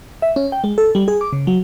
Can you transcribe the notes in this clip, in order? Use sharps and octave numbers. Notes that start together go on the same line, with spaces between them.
E5
C#4
G5
G#3
A4
G3
G#4
D6
C#3
F#3